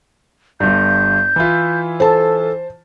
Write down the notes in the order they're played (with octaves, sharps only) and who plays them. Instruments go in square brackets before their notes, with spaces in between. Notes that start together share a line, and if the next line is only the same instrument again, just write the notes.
[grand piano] G1 G2 [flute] G6
[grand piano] E3 E4 F4
[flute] A4 [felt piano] C5 A5